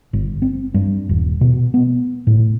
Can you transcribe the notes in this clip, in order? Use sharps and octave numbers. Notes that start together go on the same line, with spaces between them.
G1
C4
G2
D#1
B2
B3
A2